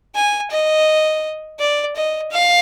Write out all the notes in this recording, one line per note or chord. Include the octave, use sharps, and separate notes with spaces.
G#5
D#5
D5
D#5
F5